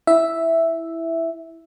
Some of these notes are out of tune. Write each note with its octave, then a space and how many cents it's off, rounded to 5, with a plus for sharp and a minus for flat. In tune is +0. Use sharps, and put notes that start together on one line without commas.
E4 +0 E5 +0